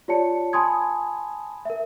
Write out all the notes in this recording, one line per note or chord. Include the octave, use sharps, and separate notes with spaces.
F4 G4 C#5 D5 A5 C#7
G#5 A5 B5 C6 D#6 G#6
A#4 E5